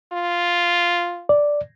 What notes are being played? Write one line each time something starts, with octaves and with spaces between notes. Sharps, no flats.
F4
D5